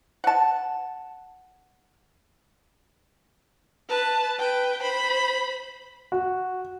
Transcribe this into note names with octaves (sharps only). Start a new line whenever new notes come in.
F#5 A5
B4 A5
B4 G5
C5 B5
F#4